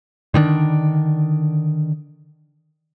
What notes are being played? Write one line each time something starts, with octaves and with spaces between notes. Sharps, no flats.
D3 D#3 A3 D4